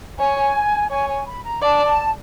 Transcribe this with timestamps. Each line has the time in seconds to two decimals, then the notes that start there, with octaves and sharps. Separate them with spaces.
0.19 C#5 G#5
0.90 C#5 G#5
1.09 G#5
1.27 B5
1.44 A#5
1.62 D5 A5
1.85 A5